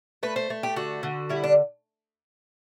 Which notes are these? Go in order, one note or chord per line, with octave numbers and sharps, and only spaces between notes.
A3 B4
C5
A3
G4
D3 F#4
D3
G3 E4
D4